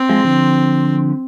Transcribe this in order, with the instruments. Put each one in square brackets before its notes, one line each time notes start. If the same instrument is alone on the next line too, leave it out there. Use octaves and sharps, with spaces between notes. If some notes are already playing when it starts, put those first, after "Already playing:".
Already playing: [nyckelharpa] C4
[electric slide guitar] F3 G#3
D3 F3